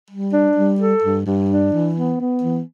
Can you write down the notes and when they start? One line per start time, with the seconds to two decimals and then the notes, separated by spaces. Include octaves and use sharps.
0.10 G3
0.33 D4
0.55 G3
0.79 A4
1.02 G2
1.25 G2
1.48 D4
1.71 E3
1.95 B3
2.18 B3
2.41 E3